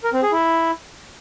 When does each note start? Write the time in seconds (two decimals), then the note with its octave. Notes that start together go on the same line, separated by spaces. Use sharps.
0.04 A#4
0.13 C4
0.23 G#4
0.32 E4